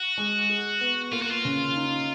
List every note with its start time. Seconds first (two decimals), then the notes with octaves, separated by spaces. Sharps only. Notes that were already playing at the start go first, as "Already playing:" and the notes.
Already playing: F#4
0.17 G#3
0.50 G#4
0.81 B3
1.13 A#3 F4
1.22 F#4
1.31 F4
1.45 C#3
1.76 D#4